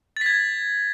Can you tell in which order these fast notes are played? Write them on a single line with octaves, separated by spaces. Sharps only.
A6 B6 G#6